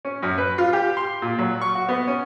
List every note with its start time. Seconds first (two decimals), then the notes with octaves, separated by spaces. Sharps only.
0.05 C#4
0.23 F#2
0.38 B4
0.58 F4
0.73 G4
0.97 C6
1.22 A#2
1.39 F#3
1.61 C#6
1.75 F#4
1.89 B3
2.07 C#4